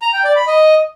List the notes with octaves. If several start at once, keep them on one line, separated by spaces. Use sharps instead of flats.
A#5
G5
D5
B5
D#5